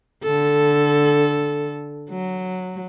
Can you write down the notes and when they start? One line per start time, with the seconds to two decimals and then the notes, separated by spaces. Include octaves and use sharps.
0.23 D3 A4
2.10 F#3